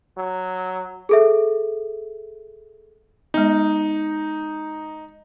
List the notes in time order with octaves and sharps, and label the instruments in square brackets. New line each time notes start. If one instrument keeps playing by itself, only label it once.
[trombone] F#3
[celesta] G#4 A4 E5
[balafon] G#3 B3 [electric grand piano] D#4